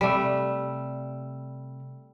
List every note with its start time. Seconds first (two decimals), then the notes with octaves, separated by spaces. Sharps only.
0.01 C3 G3 A3 D5 B5